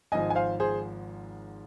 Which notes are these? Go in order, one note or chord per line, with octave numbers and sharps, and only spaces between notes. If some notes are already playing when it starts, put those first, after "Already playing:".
G#1 G#2 F3 D#5 G#5
G#5
C5 F5
G#4 C5